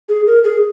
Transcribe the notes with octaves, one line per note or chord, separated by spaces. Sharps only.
G#4
A#4
G#4